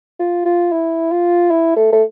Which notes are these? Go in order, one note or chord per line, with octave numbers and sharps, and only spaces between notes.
F4
F4
E4
F4
E4
A3
A3